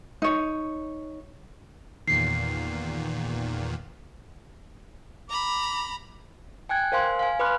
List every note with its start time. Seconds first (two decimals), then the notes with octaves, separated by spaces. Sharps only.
0.22 D#4 C#5
2.07 E2 A#2 D#3 C7
5.29 A#5 B5 D6
6.69 G5 G#5 F#6 G#6
6.92 A#4 C5 F5 G#5 C6
7.19 F5 G#5
7.40 B4 B5 C6 D6 F6 F#6